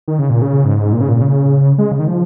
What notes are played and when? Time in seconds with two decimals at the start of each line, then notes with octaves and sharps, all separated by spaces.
0.08 D#3
0.19 C#3
0.30 A#2
0.42 C#3
0.65 G#2
0.93 A#2
1.01 C#3
1.09 A#2
1.22 C#3
1.78 G#3
1.92 C#3
1.99 D#3
2.07 F3